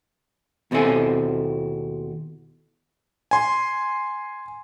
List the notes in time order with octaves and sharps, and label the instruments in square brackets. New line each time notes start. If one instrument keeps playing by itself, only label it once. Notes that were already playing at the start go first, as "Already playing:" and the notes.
[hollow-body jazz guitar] D#2 B2 C4 E4 A4 G#5
[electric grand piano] G#5 C6